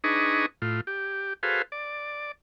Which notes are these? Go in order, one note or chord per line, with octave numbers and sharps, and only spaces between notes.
D4 D#4 G#4 B4 D#5 C#6
A2 F4
G4
F#4 G#4 A4 B4 C5 F5
D5